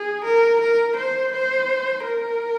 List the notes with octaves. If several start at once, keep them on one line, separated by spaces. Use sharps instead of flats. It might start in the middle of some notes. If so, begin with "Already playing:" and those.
Already playing: G#4
A#4
A#4
C5
C5
A#4